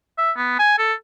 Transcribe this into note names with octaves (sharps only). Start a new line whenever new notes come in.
E5
B3
G#5
A4